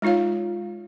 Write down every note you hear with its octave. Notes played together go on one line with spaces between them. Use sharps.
G#3 D#4 F4 C#5 F5